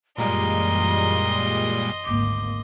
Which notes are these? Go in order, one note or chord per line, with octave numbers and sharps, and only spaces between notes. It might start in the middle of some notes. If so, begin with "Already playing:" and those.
F#2 A#2 E3 G3 G#3 D#5 A#5 C6
G#1 D2 A#3 D6